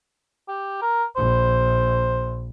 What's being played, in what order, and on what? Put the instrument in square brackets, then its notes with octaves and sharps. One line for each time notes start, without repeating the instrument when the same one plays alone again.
[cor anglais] G4
A#4
[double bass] A#1 [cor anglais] C5